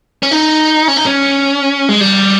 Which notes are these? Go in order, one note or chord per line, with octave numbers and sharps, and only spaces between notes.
C#4
D#4
C#4
D#4
C#4
G#3
G3